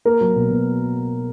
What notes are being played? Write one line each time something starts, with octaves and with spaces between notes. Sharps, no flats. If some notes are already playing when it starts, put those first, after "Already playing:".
A#3 A#4
F#3
B2
B2